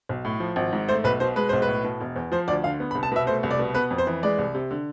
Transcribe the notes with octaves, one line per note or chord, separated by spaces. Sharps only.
B1
A2
F3
G#1
G#2
A3 C5
B1 B4
B2 C5
G#3 B4
B1 C5
B4
A2
B2
E1
E2
F3 C5
D2 D5
D3 F5
B3
B5
C2
A5
B2 E5
A3 C5
C2
D5
B2
B3 B4
F2
C5
E3
G#3 D5
C2
C3
D3